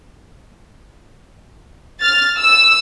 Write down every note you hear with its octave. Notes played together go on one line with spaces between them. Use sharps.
F6 A6
E6